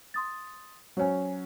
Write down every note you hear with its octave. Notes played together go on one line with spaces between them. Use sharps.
C6 D#6 A6
F#3 C#4 C5 C#5 G#5